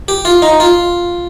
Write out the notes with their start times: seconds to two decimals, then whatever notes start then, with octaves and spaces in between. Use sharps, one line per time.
0.08 G4
0.25 F4
0.42 D#4
0.60 F4